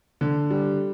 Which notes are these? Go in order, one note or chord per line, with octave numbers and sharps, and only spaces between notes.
D3
G3